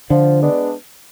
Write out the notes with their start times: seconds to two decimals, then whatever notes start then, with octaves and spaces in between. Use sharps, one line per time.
0.10 D3 F3
0.41 G#3 B3 D4